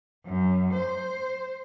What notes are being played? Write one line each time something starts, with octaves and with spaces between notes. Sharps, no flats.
F#2
C5